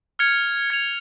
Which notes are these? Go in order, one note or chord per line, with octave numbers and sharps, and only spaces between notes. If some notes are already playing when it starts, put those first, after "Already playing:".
F6 G#6 C#7 F7
G#6 C#7 F7